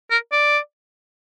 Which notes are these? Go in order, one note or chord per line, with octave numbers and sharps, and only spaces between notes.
A#4
D5